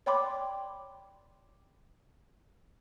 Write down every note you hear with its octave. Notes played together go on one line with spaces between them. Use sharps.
C#5 D5 G5 B5 C6 D6